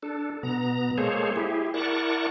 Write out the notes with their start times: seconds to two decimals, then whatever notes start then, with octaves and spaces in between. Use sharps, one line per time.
0.03 D4 A4
0.43 B2 B3 A#5
0.98 G#3 A#3 G#4 A4 C5 C#5
1.36 E4 G4 G#4
1.74 E4 A#4 D5 F#5 A5 C#6